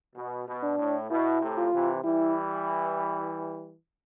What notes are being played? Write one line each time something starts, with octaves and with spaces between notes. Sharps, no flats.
B2
B2
D4
A2
B2 E4
A2 C3
F4
C3 E3
E3 G3 E4